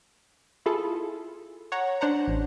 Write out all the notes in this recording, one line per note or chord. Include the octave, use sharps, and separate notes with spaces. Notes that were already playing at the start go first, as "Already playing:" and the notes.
E4 F4 G#4 A4
C#5 F#5 A#5
D4 C5 F#5 A#5
A1